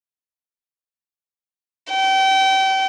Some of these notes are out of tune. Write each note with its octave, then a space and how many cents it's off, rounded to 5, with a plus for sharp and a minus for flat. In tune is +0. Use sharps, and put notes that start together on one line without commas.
G5 -30